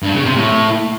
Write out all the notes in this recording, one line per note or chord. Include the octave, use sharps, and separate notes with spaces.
G2
C#3
C3
A2